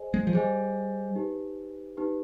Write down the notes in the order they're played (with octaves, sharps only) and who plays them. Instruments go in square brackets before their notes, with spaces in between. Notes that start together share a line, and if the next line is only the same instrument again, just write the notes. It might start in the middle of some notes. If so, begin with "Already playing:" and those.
Already playing: [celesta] G#4 C5 D#5 G#5
[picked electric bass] G#3
F3
[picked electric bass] G3 [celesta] G#4 C5 D#5 G#5
[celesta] D#4 G4 B4
D#4 G4 B4